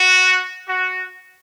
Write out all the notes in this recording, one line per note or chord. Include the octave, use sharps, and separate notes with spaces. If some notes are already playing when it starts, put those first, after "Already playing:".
Already playing: F#4
F#4